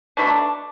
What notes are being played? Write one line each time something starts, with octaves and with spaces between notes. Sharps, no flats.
B2 F#3 A3 D4